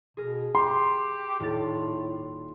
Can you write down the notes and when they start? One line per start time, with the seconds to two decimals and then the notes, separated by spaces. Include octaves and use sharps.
0.17 B2 G#4 A#4
0.55 G4 C6
1.40 D#1 A2 A6